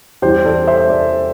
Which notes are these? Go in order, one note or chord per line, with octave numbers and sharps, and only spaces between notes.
E2 E3 G3 G4 C5
A4 D5
C5 E5
A4 D5